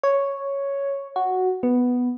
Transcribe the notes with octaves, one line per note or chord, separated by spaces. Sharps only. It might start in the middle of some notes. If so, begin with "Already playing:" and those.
C#5
F#4
B3